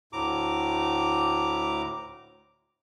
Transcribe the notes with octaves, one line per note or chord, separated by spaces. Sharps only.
D2 A2 A#5 D6